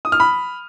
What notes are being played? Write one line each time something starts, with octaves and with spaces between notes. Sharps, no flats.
D#6
F6
B5